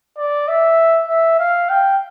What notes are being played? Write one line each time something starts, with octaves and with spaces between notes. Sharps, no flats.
D5
E5
E5
F5
G5